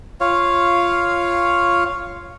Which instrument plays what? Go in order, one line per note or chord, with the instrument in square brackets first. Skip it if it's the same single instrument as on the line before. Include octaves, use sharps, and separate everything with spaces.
[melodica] F4 C#5 F5